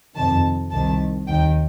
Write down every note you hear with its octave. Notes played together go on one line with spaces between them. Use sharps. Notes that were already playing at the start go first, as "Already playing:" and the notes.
F2 C3 D#3 A5
C2 C3 D#3 A5
D#2 D#3 G5